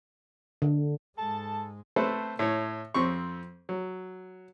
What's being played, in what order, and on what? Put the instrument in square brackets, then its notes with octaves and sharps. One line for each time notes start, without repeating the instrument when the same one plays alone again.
[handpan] D3
[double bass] G#2 G#3 [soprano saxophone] A4 [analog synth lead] A5
[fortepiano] A3 C4 A4 B4 C5
A2 C#5
F2 C4 C#6
F#3